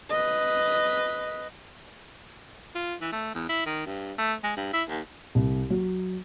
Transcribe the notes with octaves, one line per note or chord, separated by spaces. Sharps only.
B4 D#5
F4
E3
A3
E2
E4
D#3
G2
A3
G#3
G2
E4
D#2
C2
F#3